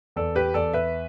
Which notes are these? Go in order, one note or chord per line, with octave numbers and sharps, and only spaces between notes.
E2 A4 D5
G4 B4
E2 A4 D5
B4 E5